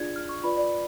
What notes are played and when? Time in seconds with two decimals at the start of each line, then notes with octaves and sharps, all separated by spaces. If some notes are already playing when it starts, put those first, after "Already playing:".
Already playing: D4 F4 G#4 D5 G#6
0.16 F6
0.29 C#6
0.44 F4 B4 D5 B5
0.57 D5